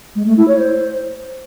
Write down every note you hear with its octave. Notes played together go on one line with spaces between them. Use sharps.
G#3
A3
E4
C#5
C5